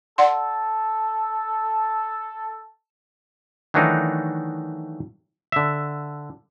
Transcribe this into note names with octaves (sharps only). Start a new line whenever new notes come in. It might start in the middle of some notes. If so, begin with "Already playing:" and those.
A4 D5 F#5 C6
D#3 E3 F#3 A3 D4 D#4
D3 E5